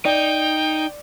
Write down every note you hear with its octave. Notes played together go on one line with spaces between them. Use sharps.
D#4 D5 G5